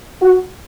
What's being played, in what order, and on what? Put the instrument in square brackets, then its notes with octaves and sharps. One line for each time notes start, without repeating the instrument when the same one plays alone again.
[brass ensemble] F#4